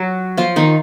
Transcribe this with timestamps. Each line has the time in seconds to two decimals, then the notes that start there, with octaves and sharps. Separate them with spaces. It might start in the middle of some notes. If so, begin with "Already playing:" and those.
Already playing: F#3 F#4
0.37 F3 F4
0.56 D#3 D#4